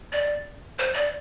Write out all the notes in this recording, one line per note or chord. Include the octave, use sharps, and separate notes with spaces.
D5
C5
D5